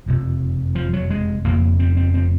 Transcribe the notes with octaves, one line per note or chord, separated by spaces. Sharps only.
F#1 F2 C3
F3
F#3
G#3
F1 F2 C#3 A#3
C4
C4
C4